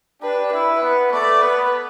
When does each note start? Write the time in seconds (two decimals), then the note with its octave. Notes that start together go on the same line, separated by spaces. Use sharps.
0.21 D4 G4 B4
0.52 E4 B4
0.82 B3
1.11 A3 D5
1.41 B3 B4